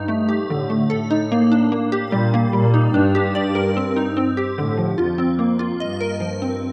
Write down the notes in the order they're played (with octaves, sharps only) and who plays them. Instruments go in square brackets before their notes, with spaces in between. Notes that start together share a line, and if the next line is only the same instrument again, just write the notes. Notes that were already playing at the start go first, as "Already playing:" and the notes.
Already playing: [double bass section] G2 [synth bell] D#4
[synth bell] A3
G4
[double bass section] A2 [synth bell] D3
[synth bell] A3
[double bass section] A2 [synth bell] A4
[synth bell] D#4
A#3
D4
A#3
G4
[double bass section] A#2 [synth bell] G3
[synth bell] A#3
[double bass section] A#2 [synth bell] G3
[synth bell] D#4
[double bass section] G2 [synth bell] D4
[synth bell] G4
D5
A#4
C4
D#4
C4
G4
[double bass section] A2 [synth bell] D3
[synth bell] F3
[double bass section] F2 [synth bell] F4
[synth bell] C4
A#3
F4
[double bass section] G2 [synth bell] D#5
[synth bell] A#4
F3
C4